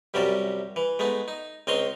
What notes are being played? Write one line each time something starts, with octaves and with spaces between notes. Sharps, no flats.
F#2 C3 G3 F#4 A#4 A5
E3
G#3 A3 B3 D#4
D#4
C#2 C4 D#5 A#5 C6 C#6